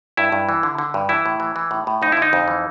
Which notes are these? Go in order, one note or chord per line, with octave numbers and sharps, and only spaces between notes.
G2 E4
G2
E3
D3
D3
G2
E3 E4
A2
E3
E3
A2
A2
F2 D#4
D3 E4
D#4
F2
E3